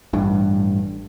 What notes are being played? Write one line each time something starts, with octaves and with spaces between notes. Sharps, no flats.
A1 G2